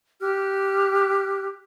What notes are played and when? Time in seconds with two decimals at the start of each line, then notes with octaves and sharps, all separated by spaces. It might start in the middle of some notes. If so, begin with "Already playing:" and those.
0.21 G4 F6 F#6